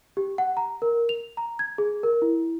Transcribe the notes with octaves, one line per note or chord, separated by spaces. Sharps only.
G4
F#5
A#5
A#4
F7
A#5
G#6
G#4
A#4
E4